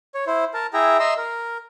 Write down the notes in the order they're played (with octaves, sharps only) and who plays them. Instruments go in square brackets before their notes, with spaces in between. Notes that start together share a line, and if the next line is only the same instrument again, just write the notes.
[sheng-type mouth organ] C#5
E4 C5
A#4 A5
E4 G#4 E5 G5 A#5
D#5 E5 A#5 C6 E6
A#4